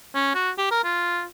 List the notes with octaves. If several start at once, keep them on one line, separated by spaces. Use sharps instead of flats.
C#4
F#4
G4
A#4
F4